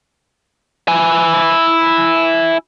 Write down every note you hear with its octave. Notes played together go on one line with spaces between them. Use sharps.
E4 G#5